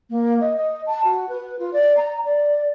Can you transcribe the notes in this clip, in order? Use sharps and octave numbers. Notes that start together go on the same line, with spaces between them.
A#3
D#5
D#5
A5
F#4
B4
F4
D5
A#5
D5